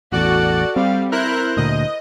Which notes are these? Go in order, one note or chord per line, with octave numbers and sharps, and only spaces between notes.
A1 E2 F#4 A4 D5 F#5
G3 C4 F5
E4 A#4 C5 F#6
D2 A#2 D3 D#5